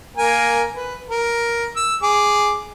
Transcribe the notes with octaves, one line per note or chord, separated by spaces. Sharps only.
A#3 A#4 G#5
B4
A#4
E6
G#4 D6